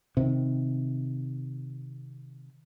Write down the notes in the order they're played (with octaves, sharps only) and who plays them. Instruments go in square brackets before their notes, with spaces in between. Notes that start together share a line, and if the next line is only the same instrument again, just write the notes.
[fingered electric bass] C3 D#3